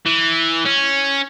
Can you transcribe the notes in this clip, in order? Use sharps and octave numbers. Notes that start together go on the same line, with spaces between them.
E3
C#4